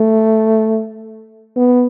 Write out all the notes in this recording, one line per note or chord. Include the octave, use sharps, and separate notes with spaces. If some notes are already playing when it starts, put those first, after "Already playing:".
Already playing: A3
B3